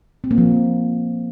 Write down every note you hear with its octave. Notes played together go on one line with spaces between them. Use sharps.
C4
A#3
F3